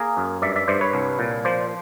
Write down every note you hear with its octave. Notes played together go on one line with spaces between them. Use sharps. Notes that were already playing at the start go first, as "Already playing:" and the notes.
Already playing: A#3 G#4 A#4
F#2
G2 D5 E5
D5 E5
G2 C5 D5
B4 C#5
C2
A#2
F3 C5 D5